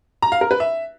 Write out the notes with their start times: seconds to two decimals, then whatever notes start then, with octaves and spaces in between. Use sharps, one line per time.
0.22 A#5
0.32 F5
0.41 A#4
0.51 B4
0.60 E5